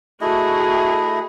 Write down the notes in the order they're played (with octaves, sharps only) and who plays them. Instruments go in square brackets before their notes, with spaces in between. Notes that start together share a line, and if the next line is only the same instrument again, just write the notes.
[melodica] A3 E4 D#5 [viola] F#4 G#4